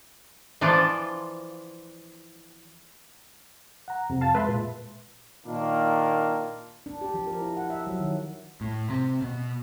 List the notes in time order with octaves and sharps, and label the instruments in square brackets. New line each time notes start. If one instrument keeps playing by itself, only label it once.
[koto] E3 F3 D4 F4
[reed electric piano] F#5 A#5
F2 C3
[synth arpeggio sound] F5 A5 A6
[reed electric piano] G#3 [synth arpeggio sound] B4 E5 C6
[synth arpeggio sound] A#2
[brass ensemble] A#2 D#3 A#3 D4 F4
[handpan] D4
G4
F3
A#4
E4
F#5
E5
F#3
D#3
[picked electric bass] A2
C3
B2